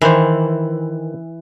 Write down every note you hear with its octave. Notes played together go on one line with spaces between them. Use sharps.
D#3 E3 C5